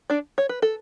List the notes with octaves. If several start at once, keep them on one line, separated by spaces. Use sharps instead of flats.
D4 D5
C#5
B4
A4